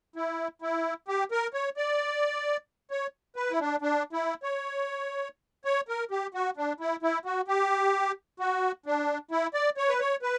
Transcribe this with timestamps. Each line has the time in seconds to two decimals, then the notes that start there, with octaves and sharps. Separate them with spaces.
0.16 E4
0.62 E4
1.08 G4
1.31 A#4
1.53 C#5
1.77 D5
2.91 C#5
3.36 B4
3.51 E4
3.60 D4
3.82 D4
4.13 E4
4.43 C#5
5.65 C#5
5.88 A#4
6.11 G4
6.34 F#4
6.57 D4
6.80 E4
7.03 E4
7.25 F#4
7.48 G4
8.40 F#4
8.86 D4
9.31 E4
9.54 D5
9.77 C#5
9.89 B4
10.00 C#5
10.22 B4